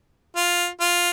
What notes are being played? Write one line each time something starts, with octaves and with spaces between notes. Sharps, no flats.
F4
F4